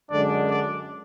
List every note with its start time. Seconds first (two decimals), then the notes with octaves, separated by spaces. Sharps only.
0.11 F#2 D3 G#3 D4 D5
0.49 D5